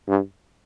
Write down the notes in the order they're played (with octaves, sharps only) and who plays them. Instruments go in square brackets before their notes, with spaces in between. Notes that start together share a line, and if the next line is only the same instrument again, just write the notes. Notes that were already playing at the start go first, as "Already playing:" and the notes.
[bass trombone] G2